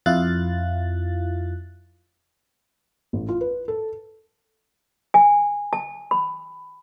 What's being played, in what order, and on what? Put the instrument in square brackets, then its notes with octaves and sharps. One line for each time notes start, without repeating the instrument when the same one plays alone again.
[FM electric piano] F2 E4 F4 F5 F#6 A6
[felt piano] A1
F4
B4
A4
[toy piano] G#5
A5
B5